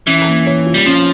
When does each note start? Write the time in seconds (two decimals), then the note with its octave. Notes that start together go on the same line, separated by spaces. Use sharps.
0.07 E3 C#4
0.27 A#3
0.46 C#5
0.66 F4
0.74 G3
0.86 F3 C#4